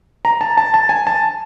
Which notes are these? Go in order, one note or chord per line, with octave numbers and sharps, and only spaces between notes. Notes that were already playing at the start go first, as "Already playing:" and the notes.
A#5
A5
A5
A5
G#5
A5